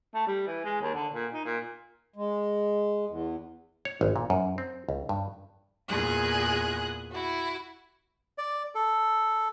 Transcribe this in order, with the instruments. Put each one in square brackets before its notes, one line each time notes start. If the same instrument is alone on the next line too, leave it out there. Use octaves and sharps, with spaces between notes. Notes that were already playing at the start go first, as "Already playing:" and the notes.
[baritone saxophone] A3
G3
E3
G#3
D#2
D3
A#2
D#4
A#2
[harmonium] G#3
E2
[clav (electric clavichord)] C#5
G#1
A#2
F#2
C4
C#2
G2
[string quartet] E2 A#2 G#4 F#6
E4 F#4
[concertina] D5
A4